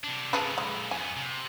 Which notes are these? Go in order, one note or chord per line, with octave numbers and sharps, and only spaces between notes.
C3 D4
A#2 D3 G#4 A4 B4
G#3
F2 B3 G#5
C3